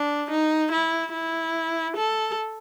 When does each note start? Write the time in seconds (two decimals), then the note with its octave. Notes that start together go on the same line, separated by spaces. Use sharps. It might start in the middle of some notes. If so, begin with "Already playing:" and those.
Already playing: D4
0.30 D#4
0.71 E4
1.12 E4
1.96 A4